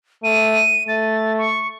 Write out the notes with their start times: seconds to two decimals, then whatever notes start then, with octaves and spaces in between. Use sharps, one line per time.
0.24 A3 D#7
0.88 A3 A6
1.38 C#6